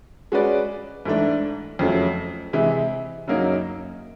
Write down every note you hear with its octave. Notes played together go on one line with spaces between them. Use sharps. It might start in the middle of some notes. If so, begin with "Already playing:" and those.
G#3 C#4 F#4 B4 D5
G#2 E3 A3 D4
F2 C#3 F#3 A3
C3 E3 G#3
F#2 C#3 F#3 A#3 D#4